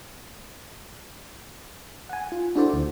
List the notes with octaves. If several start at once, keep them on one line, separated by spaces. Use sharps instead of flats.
F#5 G#5
F4
D4 E4 F#4 A4 C5 D5
D2